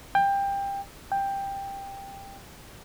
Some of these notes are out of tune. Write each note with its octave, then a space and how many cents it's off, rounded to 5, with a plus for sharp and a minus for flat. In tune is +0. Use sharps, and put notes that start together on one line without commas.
G5 +20
G5 +10